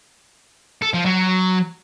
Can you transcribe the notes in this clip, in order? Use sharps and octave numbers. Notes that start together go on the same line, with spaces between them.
A4
F3
F#3